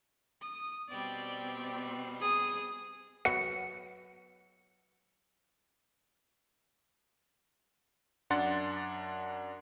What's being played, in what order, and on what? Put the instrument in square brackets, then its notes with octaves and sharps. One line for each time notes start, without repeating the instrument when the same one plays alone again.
[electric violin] D#6
[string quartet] B2 G3 C4 [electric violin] D5 G5
[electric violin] G#4 D#6
[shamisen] F#3 B3 [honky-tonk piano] C#7
[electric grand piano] F#2 D4 F#5 C6 A6